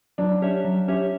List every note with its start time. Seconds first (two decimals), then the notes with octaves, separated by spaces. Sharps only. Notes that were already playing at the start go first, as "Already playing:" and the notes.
0.18 F#3 D4
0.42 C#4 G4 C#5 E5
0.65 F#3
0.88 C#4 G4 C#5 E5